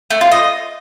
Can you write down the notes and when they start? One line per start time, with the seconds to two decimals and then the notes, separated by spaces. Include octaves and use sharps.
0.10 A3
0.21 F4
0.32 D#5